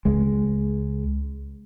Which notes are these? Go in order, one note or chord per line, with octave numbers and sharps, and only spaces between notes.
C#2 G#3